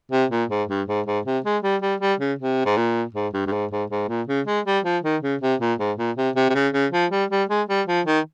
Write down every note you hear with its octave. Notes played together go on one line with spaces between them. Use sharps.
C3
A#2
G#2
G2
G#2
G#2
C3
G#3
G3
G3
G3
C#3
C3
G#2
A#2
G#2
G2
G2
G#2
G#2
G#2
A#2
C#3
G#3
G3
F3
D#3
C#3
C3
A#2
G#2
A#2
C3
C3
C3
C#3
C#3
F3
G3
G3
G#3
G3
F3
D#3